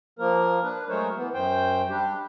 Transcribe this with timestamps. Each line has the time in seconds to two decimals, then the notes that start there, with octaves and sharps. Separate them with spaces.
0.19 F3 A#3 A#4
0.63 D4 B4
0.89 F#3 G#3 A3 A#4 C5 C#5
1.16 E3 B3
1.34 F#2 C5 G5
1.90 G3 D4 G4